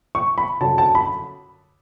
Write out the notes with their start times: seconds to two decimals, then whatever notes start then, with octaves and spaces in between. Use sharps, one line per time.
0.15 C#6
0.38 B5
0.61 F#2 D3 F#3 A5
0.78 A5
0.95 B5